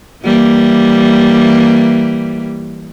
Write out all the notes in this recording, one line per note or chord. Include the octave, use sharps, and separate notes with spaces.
E3 G3 A#3